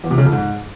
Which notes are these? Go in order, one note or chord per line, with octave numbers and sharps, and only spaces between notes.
E2
C3
C#3
F2
G#2